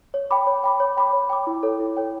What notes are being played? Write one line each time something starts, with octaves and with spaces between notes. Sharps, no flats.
C#5
G5 B5 D6
C#5
G5 B5 D6
C#5
G5 B5 D6
C#5
G5 B5 D6
E4
A4 C#5 G5
E4
A4 C#5 G5